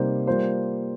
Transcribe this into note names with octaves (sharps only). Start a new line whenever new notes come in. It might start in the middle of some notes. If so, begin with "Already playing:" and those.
Already playing: C3 G3 A#3 D#4 C5
G3 A#3 F4 C5